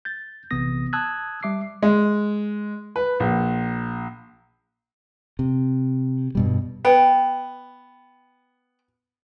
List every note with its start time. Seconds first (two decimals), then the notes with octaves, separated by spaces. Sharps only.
0.05 G6 A6
0.51 A#1 C3 E3 B3 D#6 A#6
0.93 A5 D#6 E6 F#6 G#6
1.43 G3 E5 D6 C7
1.82 G#3
2.96 B4
3.20 A#1
5.39 C3
6.35 G2 B2 G3
6.85 B3 G5